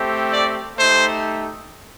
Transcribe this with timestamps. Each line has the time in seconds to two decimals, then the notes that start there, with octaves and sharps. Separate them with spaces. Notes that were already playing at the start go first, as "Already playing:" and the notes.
Already playing: A3 C4 G4
0.32 D5
0.78 A3 D#4 G4 C5